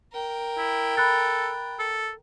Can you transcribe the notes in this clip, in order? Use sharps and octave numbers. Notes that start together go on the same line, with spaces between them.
A#4 G5
E4
A4 B5 F#6 A6
A4